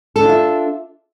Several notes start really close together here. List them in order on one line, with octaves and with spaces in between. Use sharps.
A4 D4 F4 E5